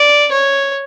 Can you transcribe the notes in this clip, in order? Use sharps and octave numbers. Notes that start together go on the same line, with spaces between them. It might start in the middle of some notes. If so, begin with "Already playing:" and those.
Already playing: D5
C#5